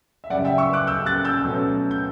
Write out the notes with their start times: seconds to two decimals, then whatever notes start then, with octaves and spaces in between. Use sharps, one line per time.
0.24 E5
0.30 F#2 C#3 G3 D5 F#5
0.45 E5 G5
0.58 C#6 E6
0.73 D6 F#6
0.87 E6 G6
1.06 F#6 A6
1.25 E6 G6
1.44 B2 F#3 A3 C#4
1.91 G6